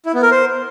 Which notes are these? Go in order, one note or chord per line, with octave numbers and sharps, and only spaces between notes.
E4
B3
A#4
C5